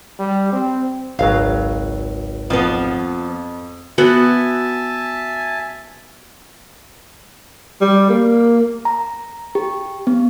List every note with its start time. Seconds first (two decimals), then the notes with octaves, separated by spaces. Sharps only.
0.19 G3
0.52 C4
1.19 G#1 C#2 F#3 F5
2.50 F2 F3 B3
3.98 B3 F#4 E5 G#5 A5
7.81 G3
8.09 A#3
8.85 A#5
9.55 G4
10.07 B3